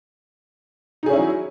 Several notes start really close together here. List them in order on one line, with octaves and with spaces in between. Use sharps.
D#4 G#4 C#4 E4 F#3